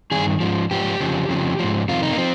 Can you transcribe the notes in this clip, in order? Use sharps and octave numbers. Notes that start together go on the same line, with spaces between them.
G2 D#3 G#4
G#2 F3
G#2 F3 G4
F2 C#3 F3
F2 C#3 F3
G#2 F3
F2 C3 D#3 F4
D#4
A#3
F3 C4